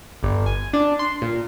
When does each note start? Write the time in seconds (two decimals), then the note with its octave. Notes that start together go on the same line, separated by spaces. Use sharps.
0.23 G1
0.46 G#5
0.73 D4
0.99 C6
1.22 A#2